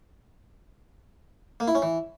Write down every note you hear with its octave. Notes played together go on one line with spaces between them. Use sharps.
A#3
E4
C#4
E3